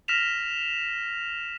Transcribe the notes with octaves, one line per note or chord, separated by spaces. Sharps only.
F6 A#6 B6 E7 F7